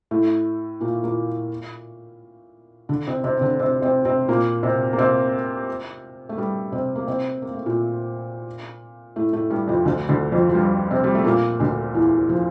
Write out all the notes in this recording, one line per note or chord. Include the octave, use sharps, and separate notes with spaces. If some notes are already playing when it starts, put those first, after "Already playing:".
A2 A3
A#2 A#3
A#2 A#3
D3 D4
C3 C4
C3 C4
C4
D3 D4
C3 C4
C3 C4
C3 C4
A#2 A#3
C3 C4
A#3
C3 C4
A3
G2 G3
C3 C4
A#3
C3 C4
A#3
A3
A#2 A#3
A2 A3
A2 A3
G2 G3
F2 F3
D2 D3
D2 D3
F2 F3
F3
G2 G3
C3 C4
G3
A3
A#2 A#3
D2 D3
E2 E3
F3